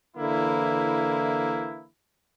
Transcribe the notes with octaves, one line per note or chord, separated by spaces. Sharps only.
D3 E3 A#3 E4